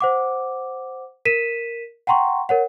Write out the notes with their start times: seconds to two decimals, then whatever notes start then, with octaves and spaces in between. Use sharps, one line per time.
0.01 C5 F#5 D6
1.25 A#4 B6 D#7 E7
2.07 F#5 G5 A#5 C6 C#6
2.49 A#4 C#5 F#5